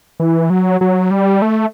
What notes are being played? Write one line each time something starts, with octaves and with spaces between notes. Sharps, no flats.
E3
F#3
F#3
G3
A3